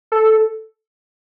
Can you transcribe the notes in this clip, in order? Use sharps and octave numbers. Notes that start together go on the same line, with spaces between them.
A4